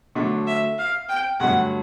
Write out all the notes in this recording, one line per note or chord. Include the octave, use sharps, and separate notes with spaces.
D3 F#3 A3 D4
E5
F5
G5
G2 D3 F#3 A3 C#4 F#5